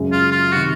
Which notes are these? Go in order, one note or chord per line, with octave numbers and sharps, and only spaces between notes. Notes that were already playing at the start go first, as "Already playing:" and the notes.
Already playing: F#2 C#3 G#3
F4
F4
C3 D#3 F#4